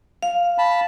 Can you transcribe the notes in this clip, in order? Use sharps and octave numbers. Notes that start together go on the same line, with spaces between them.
F5
A5 B5